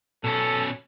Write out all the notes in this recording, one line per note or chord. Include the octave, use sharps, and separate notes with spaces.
B2 C#4 A4